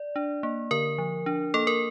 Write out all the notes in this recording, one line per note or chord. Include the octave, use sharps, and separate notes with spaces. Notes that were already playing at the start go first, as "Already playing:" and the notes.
Already playing: D5
D4
A#3
D3 A#4
F3
D4
A#3 A4
A#4